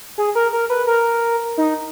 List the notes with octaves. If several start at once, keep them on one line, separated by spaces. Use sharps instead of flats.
G#4
A#4
A#4
B4
A#4
D#4